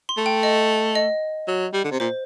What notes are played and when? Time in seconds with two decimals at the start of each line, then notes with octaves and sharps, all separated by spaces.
0.09 C6
0.17 A3
0.26 G5
0.43 D#5
0.95 D#5
1.48 F#3
1.74 G3
1.84 D3
1.92 C3
2.00 A#2 C5